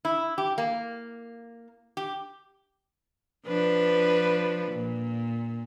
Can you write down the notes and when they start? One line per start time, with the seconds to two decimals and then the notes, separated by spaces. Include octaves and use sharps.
0.05 E4
0.38 G4
0.58 A#3
1.97 G4
3.47 F3 D4 B4
4.72 A#2